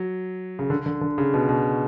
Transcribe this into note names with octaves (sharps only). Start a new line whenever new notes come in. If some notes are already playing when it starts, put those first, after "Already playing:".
Already playing: F#3
C#3
D3
D3
D3
C#3
B2
B2